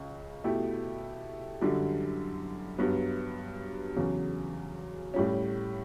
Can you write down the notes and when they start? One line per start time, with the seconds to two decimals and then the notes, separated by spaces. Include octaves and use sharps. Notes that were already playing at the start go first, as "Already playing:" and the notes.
Already playing: C#2 C#3
0.44 B2 A3 E4 G4
1.61 F#2 D3 G3
2.78 G2 F#3 B3
3.96 E2 C#3 F#3
5.14 A2 G3 C#4